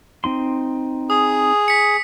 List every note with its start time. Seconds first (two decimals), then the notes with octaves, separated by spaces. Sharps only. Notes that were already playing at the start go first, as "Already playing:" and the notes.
0.24 C4 D#4 C6
1.10 G#4 D#6
1.68 B6 C#7